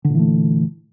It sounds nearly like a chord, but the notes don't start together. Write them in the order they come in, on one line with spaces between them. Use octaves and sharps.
D3 A#2 E3 A3